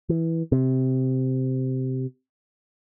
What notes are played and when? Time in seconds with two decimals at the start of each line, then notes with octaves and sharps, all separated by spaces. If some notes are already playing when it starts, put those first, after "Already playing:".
0.09 E3
0.52 C3